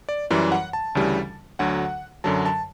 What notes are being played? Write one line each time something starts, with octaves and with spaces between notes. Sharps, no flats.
D5
F#2 E3 G3 D5
F#5
A5
D2 C#3 E3 G3
D2 D3 F#3 F#5
F#2 D3 F#3 A5
A5